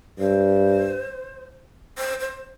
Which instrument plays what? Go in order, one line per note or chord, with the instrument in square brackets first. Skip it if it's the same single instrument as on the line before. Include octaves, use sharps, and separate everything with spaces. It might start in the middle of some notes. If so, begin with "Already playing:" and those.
[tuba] G2 [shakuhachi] C5
[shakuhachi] C5
C5